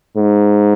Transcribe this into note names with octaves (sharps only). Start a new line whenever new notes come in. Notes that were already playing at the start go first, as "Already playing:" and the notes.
G#2